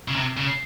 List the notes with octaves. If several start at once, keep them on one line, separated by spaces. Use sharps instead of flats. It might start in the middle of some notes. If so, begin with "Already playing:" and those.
C#3
C3
C#3